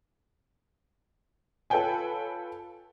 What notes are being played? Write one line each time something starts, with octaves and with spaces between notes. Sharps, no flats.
F4 A4 B4 C#5 G5 G#5